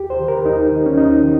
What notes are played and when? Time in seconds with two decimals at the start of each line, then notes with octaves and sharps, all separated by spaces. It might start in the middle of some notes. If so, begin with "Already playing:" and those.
Already playing: D#2 G4
0.10 C5
0.19 D#3
0.28 A#4
0.45 D#2 D#4
0.72 D#3
0.86 C#4
0.97 D#2 D#4
1.23 D#3